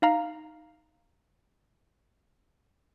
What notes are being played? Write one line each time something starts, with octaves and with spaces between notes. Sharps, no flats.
D#4 F5 A#5